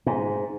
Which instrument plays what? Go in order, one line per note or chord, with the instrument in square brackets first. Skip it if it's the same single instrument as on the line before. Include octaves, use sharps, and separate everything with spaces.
[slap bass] G#2